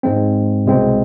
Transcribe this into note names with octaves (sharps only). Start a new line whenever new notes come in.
G#2 G#3 C4
C2 B2 G#3 C4